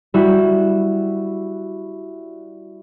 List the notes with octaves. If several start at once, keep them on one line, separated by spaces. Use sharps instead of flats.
G3 E4 F#4